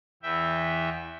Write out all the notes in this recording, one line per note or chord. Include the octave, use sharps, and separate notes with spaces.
E2 E3 E5 G5